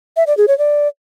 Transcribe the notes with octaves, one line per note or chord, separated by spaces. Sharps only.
E5
D5
G#4
C#5
D5